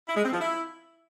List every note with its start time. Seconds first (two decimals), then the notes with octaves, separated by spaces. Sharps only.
0.08 E4
0.16 G#3
0.24 C4
0.32 F3
0.40 E4